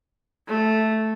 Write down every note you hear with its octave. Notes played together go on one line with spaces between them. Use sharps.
A3